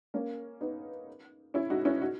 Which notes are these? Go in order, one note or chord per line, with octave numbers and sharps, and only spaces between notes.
A#3 C#4
B3 D#4
C#4 E4
D#4 F#4
C#4 E4
D#4 F#4